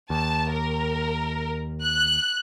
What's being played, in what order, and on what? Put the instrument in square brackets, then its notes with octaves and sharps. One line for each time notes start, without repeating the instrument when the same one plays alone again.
[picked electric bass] D#2 [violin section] A5
[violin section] A#4
F#6